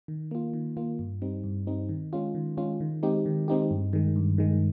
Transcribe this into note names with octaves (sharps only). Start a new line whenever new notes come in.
D#3
A#3 F4
D#3
A#3 F4
G2
G3 C4 D#4
G2
G3 C4 D#4
D#3
G#3 C#4 F4
D#3
G#3 C#4 F4
D#3
G#3 C4 D#4 G4
D#3
G#3 C4 D#4 G4
G2
D#3 G#3
G2
D#3 G#3